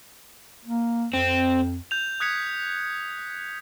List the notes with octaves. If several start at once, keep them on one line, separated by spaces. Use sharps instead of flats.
A#3
F2 C4
G6 F7
D#6 F#6 G#6 B6 C#7 F7